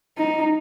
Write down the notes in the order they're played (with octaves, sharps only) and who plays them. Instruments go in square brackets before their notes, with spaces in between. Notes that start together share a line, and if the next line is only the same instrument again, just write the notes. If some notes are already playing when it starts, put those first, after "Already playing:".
[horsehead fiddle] D#4